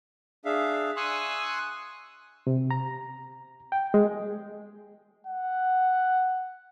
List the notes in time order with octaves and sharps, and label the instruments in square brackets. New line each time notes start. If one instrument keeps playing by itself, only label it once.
[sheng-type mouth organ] D4 G#4 E5 F5
G#5 C6 C#6 D#6 E6 F#6
[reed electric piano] C3
A#5
G5
G#3
[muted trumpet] F#5